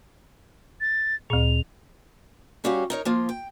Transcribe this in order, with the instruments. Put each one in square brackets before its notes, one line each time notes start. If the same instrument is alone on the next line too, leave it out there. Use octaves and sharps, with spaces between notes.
[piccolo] A6
[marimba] D2 A#2 [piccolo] F7
[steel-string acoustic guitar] G3 C#4 F#4 G4 C#5 F5
D#4 A#4 C#5
F3 A#3 F4
G5